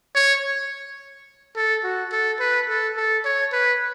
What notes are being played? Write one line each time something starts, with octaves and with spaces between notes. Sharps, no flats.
C#5
A4
F#4
A4
B4
A4
A4
C#5
B4